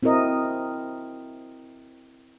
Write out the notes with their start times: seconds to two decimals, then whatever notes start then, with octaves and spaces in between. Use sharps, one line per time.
0.03 C4 E4 F#4 A#4 D#5